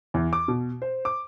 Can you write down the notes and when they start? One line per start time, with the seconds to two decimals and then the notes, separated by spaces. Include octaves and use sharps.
0.14 E2
0.33 D6
0.48 B2
0.82 C5
1.05 D6